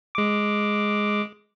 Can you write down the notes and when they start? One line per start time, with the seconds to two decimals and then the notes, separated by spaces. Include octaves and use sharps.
0.15 G#3 D6